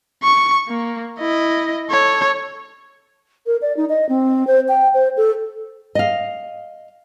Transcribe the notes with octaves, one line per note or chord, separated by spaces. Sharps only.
C#6
A#3
E4 D#5
A4 C#5
A#4
D5
D#4
D#5
C4
C5
G5
C5
A4
D#5 F5